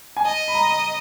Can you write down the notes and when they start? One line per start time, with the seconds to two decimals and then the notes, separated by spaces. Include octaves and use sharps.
0.17 G#5
0.25 D#5 A5
0.48 B5
0.55 A#5